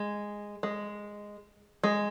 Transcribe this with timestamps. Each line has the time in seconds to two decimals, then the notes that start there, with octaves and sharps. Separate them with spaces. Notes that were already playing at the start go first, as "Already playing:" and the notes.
Already playing: G#3
0.63 G#3
1.83 G#3